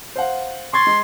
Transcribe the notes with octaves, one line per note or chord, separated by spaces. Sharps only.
C5 F5 F#5
C6 C#6 G#6 A6
G#3